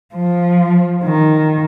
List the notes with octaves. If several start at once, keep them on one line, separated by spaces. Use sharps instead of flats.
F3
D#3